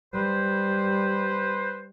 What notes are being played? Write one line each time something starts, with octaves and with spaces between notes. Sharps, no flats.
G3 B4 C5